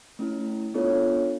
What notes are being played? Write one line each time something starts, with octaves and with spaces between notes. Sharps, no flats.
A3 C#4 E4
B3 D4 F4 A4 C#5